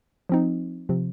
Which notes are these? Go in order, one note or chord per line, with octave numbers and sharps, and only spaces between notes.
F3 C4 D#4
C3 F3 C4